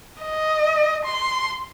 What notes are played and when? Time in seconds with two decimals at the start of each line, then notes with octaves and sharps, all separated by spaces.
0.22 D#5
1.05 C6